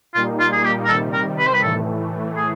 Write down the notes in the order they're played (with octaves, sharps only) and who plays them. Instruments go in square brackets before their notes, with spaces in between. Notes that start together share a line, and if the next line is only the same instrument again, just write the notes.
[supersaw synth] A#2 G3 A#3 D#4 [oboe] F4
[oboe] F4
G#4
G4
A#4
[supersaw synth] C3 D#3 G3 [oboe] A4
[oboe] A#4
B4
C5
B4
[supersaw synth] A2 E3 A3 [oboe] A4
[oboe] G#4